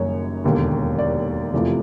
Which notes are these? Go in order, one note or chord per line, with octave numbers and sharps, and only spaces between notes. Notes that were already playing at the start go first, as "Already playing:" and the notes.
Already playing: F#1 F#2 D#3 G3 C#5
E1 D#2 D3
D5
F1 E2 C3 F3